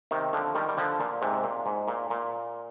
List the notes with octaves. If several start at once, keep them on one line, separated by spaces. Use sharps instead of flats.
C3 D#3
D3 F3
D#3 G3
G3
D3 F3
A#2
G#2 C3
A#2
G#2
A#2
A#2